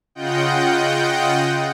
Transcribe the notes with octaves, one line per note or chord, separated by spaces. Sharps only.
C#3 F4 D#5 F#5 G5 G6